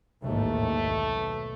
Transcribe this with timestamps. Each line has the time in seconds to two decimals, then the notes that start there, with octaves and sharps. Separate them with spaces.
0.24 A1 D#2 G#2 A3
0.74 B1